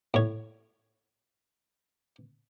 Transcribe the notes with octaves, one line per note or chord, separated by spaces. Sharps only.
A2 C#5